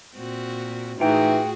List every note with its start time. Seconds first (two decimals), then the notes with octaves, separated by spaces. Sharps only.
0.17 A#2 C4 F#4
1.00 A2 E3 D#4 F4 F#4 G#4 G5